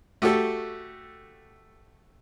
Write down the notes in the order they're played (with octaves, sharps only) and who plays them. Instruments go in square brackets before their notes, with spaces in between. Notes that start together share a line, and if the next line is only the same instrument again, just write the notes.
[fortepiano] A3 F#4 G4 A4